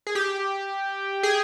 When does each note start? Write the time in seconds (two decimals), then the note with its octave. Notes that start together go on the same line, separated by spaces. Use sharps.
0.07 G#4
0.15 G4
1.23 G#4